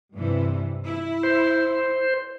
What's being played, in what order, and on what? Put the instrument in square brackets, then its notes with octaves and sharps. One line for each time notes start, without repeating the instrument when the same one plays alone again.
[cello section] G2 C3 E3
E4
[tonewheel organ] C5